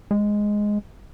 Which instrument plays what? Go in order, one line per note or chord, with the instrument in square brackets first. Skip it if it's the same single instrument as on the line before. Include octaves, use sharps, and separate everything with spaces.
[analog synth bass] G#3